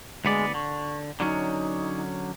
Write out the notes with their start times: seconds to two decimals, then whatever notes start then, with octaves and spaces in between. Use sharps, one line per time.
0.25 D2 G#3 B3 D5
0.54 D3 C#6
1.20 D3 F#3 C#4 D#4